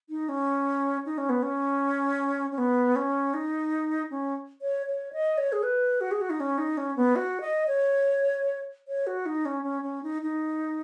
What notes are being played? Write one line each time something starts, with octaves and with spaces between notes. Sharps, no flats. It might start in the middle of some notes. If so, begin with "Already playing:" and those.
D#4
C#4
D#4
C#4
B3
C#4
C#4
B3
C#4
D#4
C#4
C#5
C#5
D#5
C#5
G#4
B4
F#4
G#4
F#4
D#4
C#4
D#4
C#4
B3
F#4
D#5
C#5
C#5
F#4
D#4
C#4
C#4
C#4
D#4
D#4